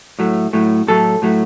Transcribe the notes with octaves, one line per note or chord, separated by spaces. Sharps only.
A2 F#3 A3
A2 F#3 A3
A2 F#3 A3 A4
A2 F#3 A3